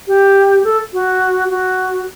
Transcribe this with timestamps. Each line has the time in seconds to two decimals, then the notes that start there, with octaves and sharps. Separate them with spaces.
0.08 G4
0.64 A4
0.93 F#4
1.50 F#4